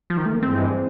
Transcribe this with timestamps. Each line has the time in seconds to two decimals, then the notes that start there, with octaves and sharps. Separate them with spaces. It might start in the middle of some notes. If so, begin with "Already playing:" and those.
0.10 F3
0.17 D#3
0.26 A3
0.34 A#3
0.42 G2 E3 G#3 C4